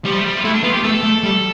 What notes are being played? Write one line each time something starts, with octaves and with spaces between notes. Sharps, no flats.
F3 G3
A3
G3
F4
A3 E4
D4
B3 F4
G4
A3 A4
A3
G3